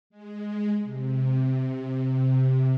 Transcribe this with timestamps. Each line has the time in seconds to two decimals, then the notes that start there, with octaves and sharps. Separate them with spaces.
0.10 G#3
0.83 C3